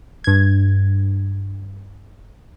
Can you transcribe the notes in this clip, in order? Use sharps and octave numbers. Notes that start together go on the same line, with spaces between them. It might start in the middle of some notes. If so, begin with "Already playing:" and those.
G2 G#6